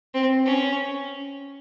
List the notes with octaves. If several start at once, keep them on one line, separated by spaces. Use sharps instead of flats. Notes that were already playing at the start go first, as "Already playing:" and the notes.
C4
C#4